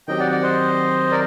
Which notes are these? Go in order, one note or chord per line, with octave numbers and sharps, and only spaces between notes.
D#3 F#3 C4 G4 D#5 G5
D5 F#5
D5 F#5
C5 D#5
A#4 D5